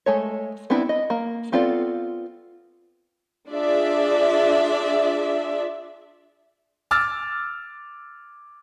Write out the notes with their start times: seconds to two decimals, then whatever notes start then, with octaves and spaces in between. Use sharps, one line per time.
0.06 G#3 A3 C#5
0.70 B3 C4 D4 E4
0.89 D#5
1.10 A#3
1.52 B3 C4 F4 A4 D5
3.50 D4 F4 G#4 D5 E5
6.91 D6 E6 F6 A6